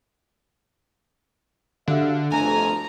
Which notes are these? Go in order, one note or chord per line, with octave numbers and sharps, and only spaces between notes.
D3 D4 F#4 G4 A4 E5 F5
G1 F2 A3 G#5 A#5